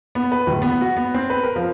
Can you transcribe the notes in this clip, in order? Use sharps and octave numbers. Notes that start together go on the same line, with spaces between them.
B3
B4
D1
B3
F#4
B3
C4
B4
A#4
F3